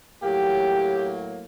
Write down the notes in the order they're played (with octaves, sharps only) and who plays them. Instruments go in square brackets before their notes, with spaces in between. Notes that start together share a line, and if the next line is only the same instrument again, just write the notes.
[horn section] A2 F#3 A#3 G4